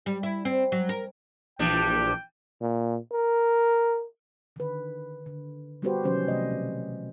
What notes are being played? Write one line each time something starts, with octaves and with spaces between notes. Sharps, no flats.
G3
E4
C4
F#3
A#4
A#1 E3 G3 D4 G5
A#2
A#4
D3 D#3 B4
D3
G3 B3 F#4 G4 B4 C5
C3 D#3 F3 F#3 C#4 C5
C3 A3 D5 D#5
B2